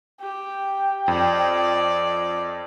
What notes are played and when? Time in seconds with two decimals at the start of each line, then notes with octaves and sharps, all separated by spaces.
0.21 G4 G5
1.08 F2 D5